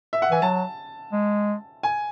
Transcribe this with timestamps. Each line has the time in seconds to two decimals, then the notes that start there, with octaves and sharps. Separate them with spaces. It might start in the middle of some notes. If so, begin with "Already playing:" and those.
0.13 E5
0.22 F#5
0.31 E3 G#5
0.42 F#3 A5
1.12 G#3
1.83 G#5